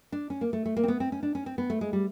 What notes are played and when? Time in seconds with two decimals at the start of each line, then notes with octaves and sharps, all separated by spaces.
0.12 D4
0.30 C#4
0.41 A#3
0.53 A3
0.66 A3
0.77 A#3
0.83 C4
0.88 B3
1.00 C4
1.12 C#4
1.23 D4
1.35 C#4
1.46 C4
1.58 B3
1.70 A3
1.81 G#3
1.93 G3